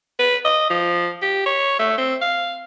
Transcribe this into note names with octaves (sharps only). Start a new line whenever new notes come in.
B4
D#5
F3
G4
C#5
A3
C4
F5